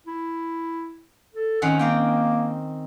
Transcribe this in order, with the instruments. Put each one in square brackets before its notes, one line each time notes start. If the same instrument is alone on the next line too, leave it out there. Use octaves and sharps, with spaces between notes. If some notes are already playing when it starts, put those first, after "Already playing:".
[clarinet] E4
A4
[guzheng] D#3 C4 C#4 [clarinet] F#5
[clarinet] A#3 [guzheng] C4 A#4 G5